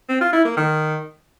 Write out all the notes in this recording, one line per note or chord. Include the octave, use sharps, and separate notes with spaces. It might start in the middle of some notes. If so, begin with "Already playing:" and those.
C4
F4
E4
A#3
D#3